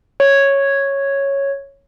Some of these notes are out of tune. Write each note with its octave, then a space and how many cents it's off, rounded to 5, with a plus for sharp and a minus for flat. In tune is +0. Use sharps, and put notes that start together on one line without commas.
C#5 -5